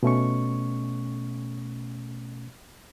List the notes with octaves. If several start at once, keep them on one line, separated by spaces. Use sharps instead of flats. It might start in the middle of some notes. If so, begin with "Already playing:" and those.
B2 A3 C#4 C#6